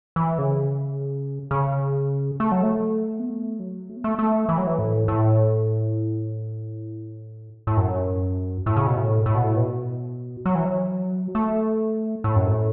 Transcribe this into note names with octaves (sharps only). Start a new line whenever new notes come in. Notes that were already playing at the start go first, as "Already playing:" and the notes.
E3
C#3
C#3
A3
F#3
A3
B3
A3
F#3
A3
B3
A3
A3
E3
F#3
E3
A2
A2
A2
F#2
A2
C#3
B2
A2
A2
B2
A2
B2
F#3
E3
F#3
A3
A2
F#2
A2